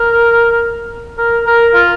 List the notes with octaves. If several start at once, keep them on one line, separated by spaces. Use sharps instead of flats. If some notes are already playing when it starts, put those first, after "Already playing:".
Already playing: A#4
A#4
A#4
F4